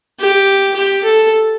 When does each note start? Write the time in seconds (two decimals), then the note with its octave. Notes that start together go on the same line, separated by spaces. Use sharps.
0.20 G4
0.75 G4
1.04 A4